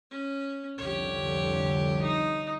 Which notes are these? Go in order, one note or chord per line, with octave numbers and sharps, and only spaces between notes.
C#4
C2 F2 D3 G4 C#5
D#4